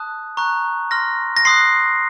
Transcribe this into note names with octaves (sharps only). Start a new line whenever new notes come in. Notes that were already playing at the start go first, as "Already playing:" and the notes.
Already playing: A5 D#6 F#6
A#5 C#6 F#6
C6 F6 A#6
A#6
C6 D#6 F#6 C7